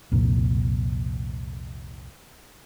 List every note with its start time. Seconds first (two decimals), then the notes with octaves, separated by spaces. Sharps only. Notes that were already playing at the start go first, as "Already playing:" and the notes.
0.12 C2 F2 A#2